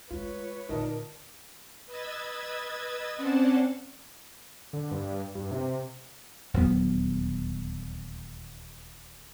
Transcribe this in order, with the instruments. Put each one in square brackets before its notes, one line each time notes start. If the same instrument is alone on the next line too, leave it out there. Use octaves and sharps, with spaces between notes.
[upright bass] G#3 A3 [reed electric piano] F4 [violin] B4 C#5
[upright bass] A#2 D3 [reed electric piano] D#4 F4 D5 [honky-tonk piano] A#4 D#5 A5
[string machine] B4 D#5 E6 G#6 A6
C4 C#4 C5 D5 F#5 A5
[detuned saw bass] D3
G2
G2
C3
[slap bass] D#1 D2 F#3 B3